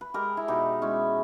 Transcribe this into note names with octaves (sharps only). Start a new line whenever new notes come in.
B4
G#3 G4 A#4
E4
B2 D#4 G4
G#3 C#4 E4